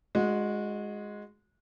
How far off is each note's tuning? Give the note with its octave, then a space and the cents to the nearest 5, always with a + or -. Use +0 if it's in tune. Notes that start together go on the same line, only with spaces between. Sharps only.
G#3 +0 D4 +35 F#4 -25